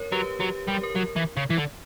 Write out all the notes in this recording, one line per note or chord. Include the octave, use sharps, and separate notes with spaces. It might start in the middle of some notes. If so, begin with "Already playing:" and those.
Already playing: A#4 C#5
F#3 G4 B4
F#3 G4
G3 A#4
G4
A#4
F#3
E3
C#3
E3
D3